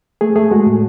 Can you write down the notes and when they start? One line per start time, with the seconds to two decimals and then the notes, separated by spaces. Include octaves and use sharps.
0.21 A3 G#4
0.36 A3 G#4
0.51 G#3 F#4
0.66 A2